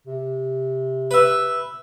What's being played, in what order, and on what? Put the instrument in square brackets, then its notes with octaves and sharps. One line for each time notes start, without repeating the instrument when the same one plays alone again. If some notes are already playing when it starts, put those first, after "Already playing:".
[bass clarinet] C3
[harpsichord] B4 E5